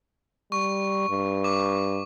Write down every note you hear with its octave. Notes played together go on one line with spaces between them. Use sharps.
G3 C#6
G2
D6